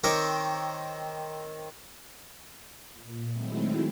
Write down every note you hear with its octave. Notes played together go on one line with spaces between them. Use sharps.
D#3 C4 A#4 C#5 D6
A#2
D#3 F#3 G#3 A3 C4 E4